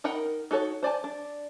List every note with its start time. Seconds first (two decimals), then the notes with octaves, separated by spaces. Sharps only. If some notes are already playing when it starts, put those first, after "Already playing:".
0.04 D#4 A#4 F#5 G5 B5
0.51 D#4 F#4 A4 C#5
0.83 C5 D5 G#5 A5
1.04 D4